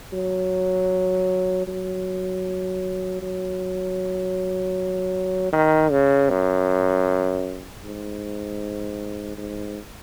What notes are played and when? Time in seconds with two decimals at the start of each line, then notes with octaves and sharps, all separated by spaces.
0.13 F#3
1.67 F#3
3.22 F#3
5.53 D#3
5.91 C#3
6.29 F#2
7.84 G#2
9.38 G#2